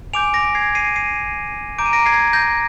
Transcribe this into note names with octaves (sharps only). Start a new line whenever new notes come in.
G#5 D6 G6 D7 F7
A#6 D7
G#6 C7
C7 D#7
C7 D#7
A#5 D6 G6 D7
D#7
A#6 D7
G#6 C7
G6 A#6